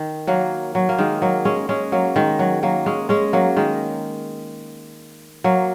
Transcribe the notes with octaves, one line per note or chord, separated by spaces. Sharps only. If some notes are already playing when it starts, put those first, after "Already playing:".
Already playing: D#3
F#3 A#3
F#3
A#3
D#3 G#3
F#3 A#3
G#3 C#4
G#3 C#4
F#3 A#3
D#3 G#3
F#3
F#3 A#3
G#3 C#4
G#3 C#4
F#3 A#3
D#3 G#3
F#3 A#3